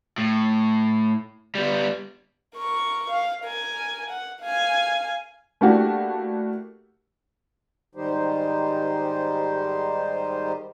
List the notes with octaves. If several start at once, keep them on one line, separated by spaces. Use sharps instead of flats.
A2
G3 B3
A#4 C#6
F5
A#4 G#5
F#5
F5 G#5
A3 A#3 D4 E4 F#4 G4
G#2 D#3 G3 D#4 G4 C5